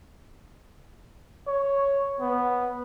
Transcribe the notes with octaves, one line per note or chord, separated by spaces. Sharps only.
C#5
B3